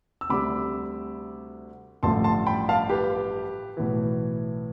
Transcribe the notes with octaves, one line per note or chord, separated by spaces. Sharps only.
E6
D2 C3 G3 B5 D6
A1 G2 D3 F3 A3 A5 C6
A5 C6
G5 B5
F5 A5
G4 B4
B1 A2 E3